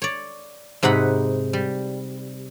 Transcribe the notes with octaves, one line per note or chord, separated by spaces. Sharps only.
C#5 D5
G#2 C3 D#4 F#5 B5
G3